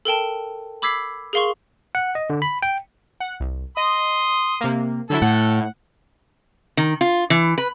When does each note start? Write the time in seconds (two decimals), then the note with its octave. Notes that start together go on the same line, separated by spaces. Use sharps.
0.05 A4 A#4 G5 A5
0.82 B5 D6 E6 G#6 B6 C7
1.33 G#4 A#4 F5 C6 C#6
1.95 F#5
2.15 D#5
2.30 D3
2.42 B5
2.62 G5
3.20 F#5
3.40 C2
3.77 D#5 C6 D#6
4.61 C3 A#3
5.10 D3 F#3 E4 A4
5.22 A2 F#5
6.77 D#3
7.01 F4
7.30 E3
7.58 B4